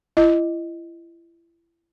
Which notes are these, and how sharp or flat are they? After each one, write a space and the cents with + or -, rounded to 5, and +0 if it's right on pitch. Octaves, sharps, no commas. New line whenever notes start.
E4 +35 D#5 +0